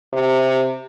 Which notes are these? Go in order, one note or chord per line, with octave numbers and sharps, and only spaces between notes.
C3